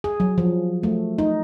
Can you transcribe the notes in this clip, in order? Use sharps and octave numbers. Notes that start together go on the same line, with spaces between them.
G#4
F#3
F3
A3
D#4